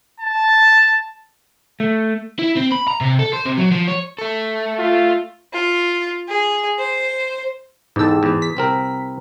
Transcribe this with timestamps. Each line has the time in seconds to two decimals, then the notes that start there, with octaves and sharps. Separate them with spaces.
0.20 A5
1.80 A3
2.39 E4
2.57 C4
2.72 B5
2.88 A#5
3.01 C3
3.19 A4
3.33 C5
3.46 C3
3.58 F#3
3.72 F3
3.88 C#5
4.18 A3 A4
4.79 F4
5.53 F4
6.28 G#4
6.79 C5
7.96 E2 G#2 G4 A4 E6
8.23 E2
8.42 B6
8.57 C2 C4 A#4